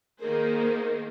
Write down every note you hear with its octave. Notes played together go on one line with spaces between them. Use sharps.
D#3 A#3 D#4 G#4 A#4 C5